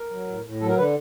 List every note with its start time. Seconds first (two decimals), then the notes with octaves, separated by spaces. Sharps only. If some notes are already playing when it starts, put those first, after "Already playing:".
Already playing: A#4
0.10 F#3
0.27 A2
0.44 A2
0.61 F#3 A4
0.69 A#4
0.78 D3 B4